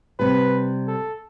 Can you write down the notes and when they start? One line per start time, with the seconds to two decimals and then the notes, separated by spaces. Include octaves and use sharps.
0.19 C3 G3 B4
0.88 A4